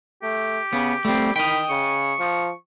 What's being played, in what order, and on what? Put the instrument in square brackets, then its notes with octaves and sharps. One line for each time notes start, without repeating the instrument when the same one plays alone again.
[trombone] A3 [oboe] G4
[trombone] C#3 [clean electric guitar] B3
[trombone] G3 [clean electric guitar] A3 C4
[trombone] D#3 [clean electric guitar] D#5 G5 [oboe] B5
[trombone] C#3 [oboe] C#6
[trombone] F3